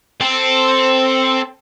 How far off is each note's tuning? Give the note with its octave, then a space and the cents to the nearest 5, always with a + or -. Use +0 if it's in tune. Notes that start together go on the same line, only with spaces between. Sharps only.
C4 +0 A4 +0